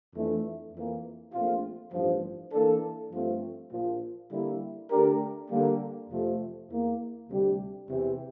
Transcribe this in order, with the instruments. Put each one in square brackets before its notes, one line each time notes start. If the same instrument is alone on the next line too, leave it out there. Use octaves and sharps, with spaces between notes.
[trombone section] F2 E3 A3 D4
F2 E3 A#3
A#1 A#2 A3 C4 F4
A1 G2 F3
E3 A#3 D4 A4
G2 F3 A3 C4 F4
A#1 A#2 F3
D3 G3 A#3 E4
D3 A3 D4 G4 A#4
D3 G3 A#3
F2 C3 F3 A3
E2 E3 A#3
D2 C3 G3 D4 G4
E2 C3 E3